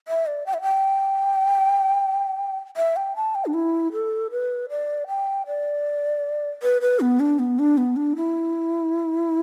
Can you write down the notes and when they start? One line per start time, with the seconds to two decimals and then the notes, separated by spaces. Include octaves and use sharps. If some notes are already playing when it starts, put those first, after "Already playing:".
0.08 E5
0.26 D5
0.46 G5
0.54 E5
0.62 G5
2.77 E5
2.96 G5
3.16 A5
3.35 G5
3.46 D4
3.54 E4
3.93 A4
4.31 B4
4.70 D5
5.08 G5
5.47 D5
6.63 B4
6.81 B4
7.00 B3
7.20 D4
7.39 B3
7.59 D4
7.78 B3
7.96 D4
8.16 E4